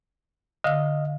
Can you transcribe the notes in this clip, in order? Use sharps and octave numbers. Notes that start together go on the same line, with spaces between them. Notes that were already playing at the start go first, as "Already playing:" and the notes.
D3 D#5 F5 E6